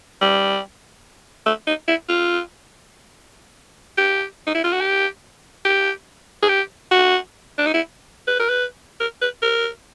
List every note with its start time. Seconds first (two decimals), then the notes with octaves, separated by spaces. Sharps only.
0.21 G3
1.46 A3
1.67 D#4
1.88 E4
2.09 F4
3.98 G4
4.47 D#4
4.55 E4
4.64 F4
4.72 F#4
4.81 G4
5.65 G4
6.42 G#4
6.48 G4
6.91 F#4
7.58 D4
7.67 D#4
7.74 E4
8.27 B4
8.39 A#4
8.49 B4
9.00 A#4
9.22 B4
9.42 A#4